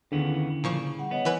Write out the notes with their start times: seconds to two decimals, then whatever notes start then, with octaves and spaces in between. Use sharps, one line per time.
0.12 D#2 D3 B3 C#4 E4 G#4
0.64 A#2 C#3 F3 C#6
0.98 G3 F#5
1.11 B3 C#5 D#5 F#5
1.25 E3 B4 G#5